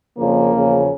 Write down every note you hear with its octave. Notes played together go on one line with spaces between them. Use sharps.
F2 C#3 F3 A#3
E2 C#3 F3